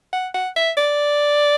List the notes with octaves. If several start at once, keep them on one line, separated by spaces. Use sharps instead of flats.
F#5
F#5
E5
D5